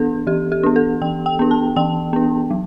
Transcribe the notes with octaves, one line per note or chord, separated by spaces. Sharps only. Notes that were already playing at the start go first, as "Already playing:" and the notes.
Already playing: E3 B3 D4 A4
E3 G4
G4
B3 D4
A4
E3 G5
G5
B3 D4
A5
E3 G5
B3 D4
F#3